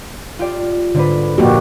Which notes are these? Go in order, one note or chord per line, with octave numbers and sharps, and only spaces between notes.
F4 G4 D5
G#2 D3 D4 B4
F2 A#2 A#3 F#4 G4